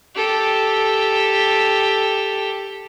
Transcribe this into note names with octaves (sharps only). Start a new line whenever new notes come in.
G4 A4